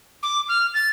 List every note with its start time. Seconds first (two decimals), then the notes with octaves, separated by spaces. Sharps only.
0.23 D6
0.49 F6
0.74 A6